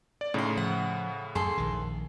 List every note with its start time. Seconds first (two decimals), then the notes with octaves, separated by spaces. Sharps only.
0.21 D5
0.34 A2 C#3 D#4 C6
0.57 F3 F#5
1.35 F#2 G#4 A4 C6
1.57 A#1 D#3